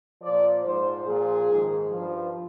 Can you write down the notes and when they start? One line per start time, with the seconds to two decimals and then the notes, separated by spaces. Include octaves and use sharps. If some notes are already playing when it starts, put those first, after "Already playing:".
0.22 A#2 F3 D5
0.64 G#2 F3 C5
1.06 A#2 F3 G#4
1.49 G#2 D#3
1.91 G2 F3